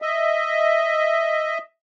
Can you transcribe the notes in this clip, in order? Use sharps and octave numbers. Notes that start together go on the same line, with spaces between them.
D#5 E5